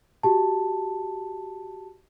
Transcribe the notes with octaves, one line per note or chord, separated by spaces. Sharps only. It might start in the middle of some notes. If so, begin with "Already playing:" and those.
F#4 G4 A5